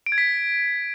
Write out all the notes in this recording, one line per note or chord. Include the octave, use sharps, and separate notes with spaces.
D7
G#6
B6